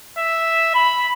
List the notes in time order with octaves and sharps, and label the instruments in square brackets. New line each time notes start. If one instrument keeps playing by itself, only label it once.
[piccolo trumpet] E5
B5